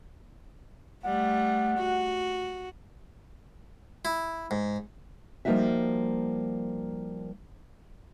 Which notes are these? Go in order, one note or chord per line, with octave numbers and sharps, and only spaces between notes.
G3 A3 F#5
F#4
E4
G#2
F3 G3 A#3 D#4 F#4 E5